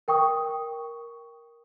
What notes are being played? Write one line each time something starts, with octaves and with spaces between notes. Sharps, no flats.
A#4 G5 C#6 D#6